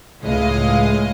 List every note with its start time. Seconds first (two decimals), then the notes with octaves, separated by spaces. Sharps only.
0.24 C#2 A2 G#3 D#5 F5